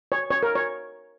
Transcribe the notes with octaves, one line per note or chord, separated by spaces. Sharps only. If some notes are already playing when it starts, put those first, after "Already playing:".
C#5
C#5
A#4
C#5